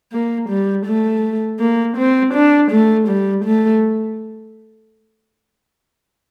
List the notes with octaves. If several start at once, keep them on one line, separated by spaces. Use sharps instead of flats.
A#3
G3
A3
A#3
C4
D4
A3
G3
A3